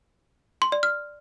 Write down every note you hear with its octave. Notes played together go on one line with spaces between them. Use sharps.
C6
D5
F6